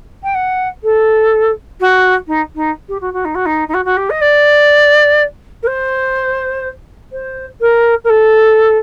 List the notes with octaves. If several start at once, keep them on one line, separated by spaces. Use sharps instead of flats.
G5
F#5
A4
F#4
D#4
D#4
G4
F#4
F#4
D#4
F#4
D#4
D#4
F#4
F#4
G4
D#5
D5
A#4
C5
C5
A#4
A#4
A4